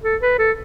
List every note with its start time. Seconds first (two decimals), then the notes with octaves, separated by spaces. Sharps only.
0.03 A4
0.21 B4
0.39 A4